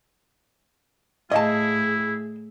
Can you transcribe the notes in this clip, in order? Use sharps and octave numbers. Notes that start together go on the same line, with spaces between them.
A2 E4 G#4 D#5 F5 A5